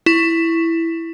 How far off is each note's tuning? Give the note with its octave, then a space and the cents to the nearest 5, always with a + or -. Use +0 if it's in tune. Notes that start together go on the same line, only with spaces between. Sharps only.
E4 +5 C#6 +0